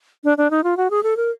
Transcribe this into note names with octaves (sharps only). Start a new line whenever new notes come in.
D4
D4
D#4
F4
F#4
G#4
A4
A#4